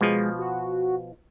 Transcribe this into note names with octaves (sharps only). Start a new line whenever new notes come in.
B2 F3 G#3
F#4